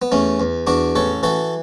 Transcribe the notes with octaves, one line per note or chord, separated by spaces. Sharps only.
B3
E2 A3 C#4
E2
E2 D4 F#4
A1 A4 C#5
E3 F#4 A4